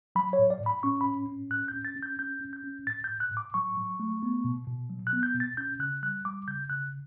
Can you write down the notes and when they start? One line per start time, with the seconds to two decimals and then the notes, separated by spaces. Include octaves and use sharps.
0.16 F#3 B5
0.33 C#5
0.39 A2
0.50 D5
0.61 A2
0.66 B5
0.83 C#4 C#6
1.01 B5
1.06 A2
1.29 C#4
1.51 A2 F#6
1.68 G6
1.73 C#4
1.85 A6
1.96 C#4
2.03 G6
2.19 C#4 G6
2.41 C#4
2.53 G6
2.64 C#4
2.86 A2 A6
3.04 G6
3.10 A2
3.20 F#6
3.31 A2
3.37 D6
3.54 F#3 C#6
3.77 F#3
4.00 A3
4.23 B3
4.45 B2
4.67 B2
4.90 F#3
5.07 F#6
5.13 B3
5.23 G6
5.35 B2
5.40 A6
5.57 C#4 G6
5.79 C#3 F#6
6.03 G3 F#6
6.25 G3 D6
6.48 C#3 G6
6.70 C#3 F#6